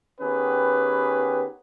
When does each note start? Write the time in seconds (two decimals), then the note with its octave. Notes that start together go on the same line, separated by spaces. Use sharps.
0.20 D#3 B3 C#4 G4 G#4 B4